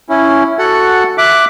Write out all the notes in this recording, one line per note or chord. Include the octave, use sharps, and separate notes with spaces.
C#4 E4
F#4 A4 F#5
E5 D6 F#6